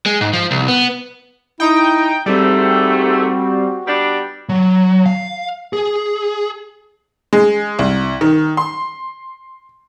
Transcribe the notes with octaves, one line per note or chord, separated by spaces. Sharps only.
G#3
G#2
F3
C2
B3
D#4 E4 G5
G#2 G3 A3 C4 F#4
G3 B3 D4
F#3
F5
G#4
G#3
C2
D#3
C6